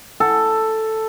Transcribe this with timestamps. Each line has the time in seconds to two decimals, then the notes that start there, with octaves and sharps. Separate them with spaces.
0.20 A4